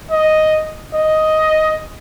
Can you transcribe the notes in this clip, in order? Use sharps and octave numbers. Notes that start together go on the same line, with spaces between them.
D#5
D#5